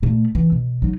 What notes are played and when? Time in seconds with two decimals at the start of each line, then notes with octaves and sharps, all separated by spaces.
0.02 A#2 A3
0.35 E3
0.52 B2
0.82 F#3 D#4